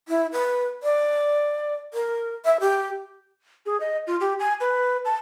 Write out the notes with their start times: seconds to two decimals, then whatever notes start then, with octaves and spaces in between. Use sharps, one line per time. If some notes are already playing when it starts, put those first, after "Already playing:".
0.08 E4
0.32 B4
0.83 D5
1.94 A#4
2.45 E5
2.60 G4
3.66 G#4
3.80 D#5
4.07 F4
4.20 G4
4.40 G#5
4.60 B4
5.05 A5